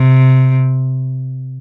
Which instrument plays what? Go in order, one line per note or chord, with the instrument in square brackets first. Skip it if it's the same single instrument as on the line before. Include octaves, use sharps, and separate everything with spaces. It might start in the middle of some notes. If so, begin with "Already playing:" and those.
Already playing: [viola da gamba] C3